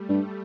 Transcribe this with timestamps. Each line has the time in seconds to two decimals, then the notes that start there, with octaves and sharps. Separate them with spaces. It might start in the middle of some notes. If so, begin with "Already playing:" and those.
Already playing: G3 A3
0.09 G2